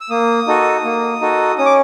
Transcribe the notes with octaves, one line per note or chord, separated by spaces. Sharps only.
E6
A#3 D#6
D#4 F#4 A4
A#3
D#4 F#4 A4
C#4 D#6
D6